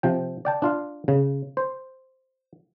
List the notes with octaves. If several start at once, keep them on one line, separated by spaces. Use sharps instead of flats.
C3 F3 G5
D5 G5 A5
D4 F4 F5
C#3
C5